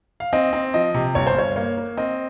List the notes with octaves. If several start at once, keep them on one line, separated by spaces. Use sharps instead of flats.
F5
C4 D#5
C4
F3 D#5
C3
G1 C#5
C5
G2 C#5
A#3 C#5
A#3
C4 D#5